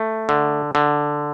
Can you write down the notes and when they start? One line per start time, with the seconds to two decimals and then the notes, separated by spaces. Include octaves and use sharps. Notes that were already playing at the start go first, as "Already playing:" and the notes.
Already playing: A3
0.29 D3
0.75 D3